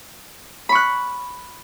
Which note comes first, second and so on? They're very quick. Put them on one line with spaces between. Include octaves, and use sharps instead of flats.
B5 C#6 F#6